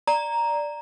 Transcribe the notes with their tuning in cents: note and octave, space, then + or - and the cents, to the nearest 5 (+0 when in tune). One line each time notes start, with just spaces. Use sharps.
D5 +0 A#5 +0